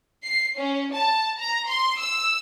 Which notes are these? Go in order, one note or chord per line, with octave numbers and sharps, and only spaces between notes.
C7
C#4
A5
A#5
C6
E6